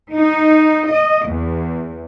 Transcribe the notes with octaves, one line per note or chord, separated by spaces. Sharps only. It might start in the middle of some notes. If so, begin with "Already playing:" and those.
D#4
D#5
E2